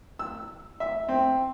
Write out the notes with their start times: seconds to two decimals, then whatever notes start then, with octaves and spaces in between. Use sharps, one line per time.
0.19 E6
0.80 E5
1.09 C4